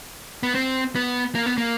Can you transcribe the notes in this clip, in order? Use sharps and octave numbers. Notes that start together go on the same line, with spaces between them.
B3
C4
B3
A#3
B3
A#3